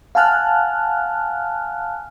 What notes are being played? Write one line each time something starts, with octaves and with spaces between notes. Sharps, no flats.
F5 F#5 G#5 A5 F6 F#6